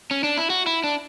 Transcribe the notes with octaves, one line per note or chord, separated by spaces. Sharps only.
C#4
D4
E4
F#4
E4
D4